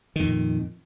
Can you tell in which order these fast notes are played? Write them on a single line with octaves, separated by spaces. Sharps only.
D#3 F2 A#2